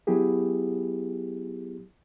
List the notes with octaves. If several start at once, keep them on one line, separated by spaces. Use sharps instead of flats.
F#3 B3 E4 G4 G#4